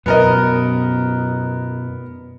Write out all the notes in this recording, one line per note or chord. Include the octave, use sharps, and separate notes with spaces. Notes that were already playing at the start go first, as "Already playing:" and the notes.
F#2 B2 B3 A#4 D#5